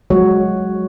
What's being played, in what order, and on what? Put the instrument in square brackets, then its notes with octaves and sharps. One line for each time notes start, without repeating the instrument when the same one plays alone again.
[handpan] F#3 G#3 F#4 C#5